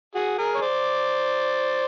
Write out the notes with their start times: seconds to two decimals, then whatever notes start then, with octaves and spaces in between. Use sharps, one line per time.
0.15 F#4 G#4
0.38 G#4 A#4
0.55 C#5
0.62 C5 D5